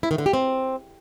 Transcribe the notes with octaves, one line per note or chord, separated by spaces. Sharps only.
E4
D#3
D3
G4
C4